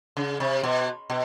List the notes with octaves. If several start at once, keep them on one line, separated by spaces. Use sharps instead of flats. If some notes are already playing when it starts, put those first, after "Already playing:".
C#3
C3
B2
B2